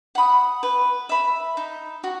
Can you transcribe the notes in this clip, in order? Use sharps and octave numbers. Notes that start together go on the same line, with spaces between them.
F#5 B5 D#6
B4
E5 B5
D#4
F#4